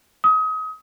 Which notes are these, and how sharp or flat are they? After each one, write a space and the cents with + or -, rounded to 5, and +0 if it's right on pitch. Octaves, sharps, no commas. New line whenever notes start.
D#6 +30